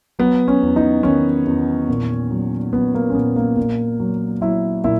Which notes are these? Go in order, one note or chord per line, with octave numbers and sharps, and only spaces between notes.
F#3 B3
C#4
E2
D#4
D#3 C#4
E2
A#2
F#3
F#3 B3
A#3
C#4
A#2 B3
A#3
A#2
F#3
F#3 E4
A#2 E4